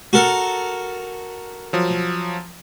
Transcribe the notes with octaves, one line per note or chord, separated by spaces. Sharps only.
F#4 A4 A#4
F3 F#3